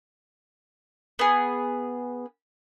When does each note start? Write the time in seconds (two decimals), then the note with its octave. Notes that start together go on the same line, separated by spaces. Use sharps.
1.19 B3 G#4